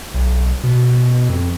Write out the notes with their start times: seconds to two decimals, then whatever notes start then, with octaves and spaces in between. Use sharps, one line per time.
0.14 B1
0.64 B2
1.29 F2